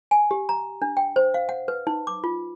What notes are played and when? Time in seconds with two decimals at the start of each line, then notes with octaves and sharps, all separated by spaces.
0.11 G#5
0.31 G4
0.49 A#5
0.82 D4
0.97 G5
1.16 C5
1.34 F5
1.49 F#5
1.68 B4
1.87 D#4
2.07 D6
2.24 F4